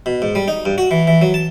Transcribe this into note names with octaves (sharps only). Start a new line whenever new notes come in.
B2
G#2
G3
D#4
G2
F#4
E3
E3
F#3
A5